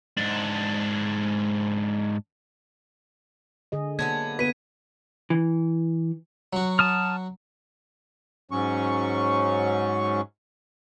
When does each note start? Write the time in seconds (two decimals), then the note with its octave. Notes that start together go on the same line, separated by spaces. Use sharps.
0.17 G#2 D4
3.72 D3 G#4 D#5
3.99 D3 F#3 A#3 B3 G#6
4.39 F#3 B3 B6 D#7
5.30 E3
6.53 F#3 F#4
6.79 A5 D#6 F6
8.51 G#2 F#3 C#4 C#6